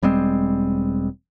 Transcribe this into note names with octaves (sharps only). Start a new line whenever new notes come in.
E1 G3 G#3 C4